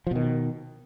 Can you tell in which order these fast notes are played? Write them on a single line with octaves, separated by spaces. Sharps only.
F3 B2 D#3